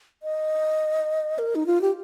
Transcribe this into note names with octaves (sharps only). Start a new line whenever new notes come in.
D#5
A#4
D#4
F4
G4